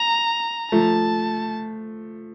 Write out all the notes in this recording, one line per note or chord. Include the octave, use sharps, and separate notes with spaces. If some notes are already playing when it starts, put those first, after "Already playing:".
Already playing: A#5
F3 A3 A5